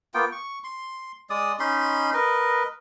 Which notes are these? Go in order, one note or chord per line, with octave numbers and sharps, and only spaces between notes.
A#3 B3 F4 G5
C#6
C6
G#3 D5 D#6
C#4 D#4 B5 C6
A#4 B4 D#5